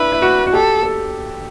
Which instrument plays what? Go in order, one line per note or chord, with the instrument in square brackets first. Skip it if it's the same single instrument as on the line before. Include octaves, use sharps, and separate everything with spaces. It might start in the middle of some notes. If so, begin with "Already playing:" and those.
Already playing: [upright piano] D4 E4 [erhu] B4
[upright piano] E4
F#4
F#4
[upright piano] G4 [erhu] A4
[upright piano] A4